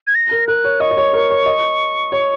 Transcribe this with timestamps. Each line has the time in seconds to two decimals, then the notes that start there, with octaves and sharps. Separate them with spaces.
0.07 G#6
0.15 A#6
0.31 A#4
0.48 A#4 F#6
0.64 C#5
0.80 D#5 C#6
0.91 D#5
0.97 C#5
1.13 A#4
1.30 C#5
1.46 D#5
2.12 C#5